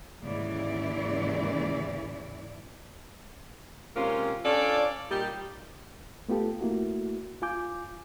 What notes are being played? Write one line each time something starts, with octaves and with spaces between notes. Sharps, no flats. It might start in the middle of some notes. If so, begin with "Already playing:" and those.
D#2 G#2 C#3 E3 E4 D5
C3 G#3 A#3 C4 C#4 F4
C#4 D4 F4 A4 D5
A#2 G3 D#4 G4
A3 B3 F4 G4 A4
A3 A#3 E4 F#4
F4 G#5 D6 G6